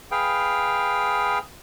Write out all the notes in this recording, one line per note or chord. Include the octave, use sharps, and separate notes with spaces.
G#4 B4 F5 G5